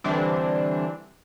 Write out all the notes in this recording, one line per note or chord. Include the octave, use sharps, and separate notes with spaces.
D3 E3 G3 C4 D4